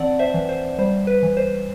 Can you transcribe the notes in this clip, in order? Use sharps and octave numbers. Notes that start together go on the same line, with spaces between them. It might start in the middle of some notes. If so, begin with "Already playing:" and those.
Already playing: E3 C4 D5 F#5 A5
C5 E5
E3
C5
G3 C5
B4
E3
C5